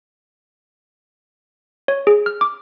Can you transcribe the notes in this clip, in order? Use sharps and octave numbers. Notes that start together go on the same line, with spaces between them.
C#5
G#4
F6
D6